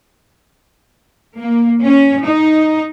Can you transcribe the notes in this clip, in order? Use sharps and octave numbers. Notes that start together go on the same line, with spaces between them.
A#3
C#4
D#4